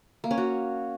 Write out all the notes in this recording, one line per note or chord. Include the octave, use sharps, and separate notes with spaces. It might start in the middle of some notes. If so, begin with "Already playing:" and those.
A#3
C#4
F#4